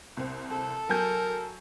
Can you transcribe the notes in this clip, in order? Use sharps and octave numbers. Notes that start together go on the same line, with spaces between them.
C2 C4
A4
F#3 A#4 G#5 G6